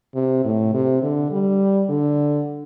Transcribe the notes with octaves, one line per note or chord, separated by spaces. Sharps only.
C3
A2
C3
D3
G3
D3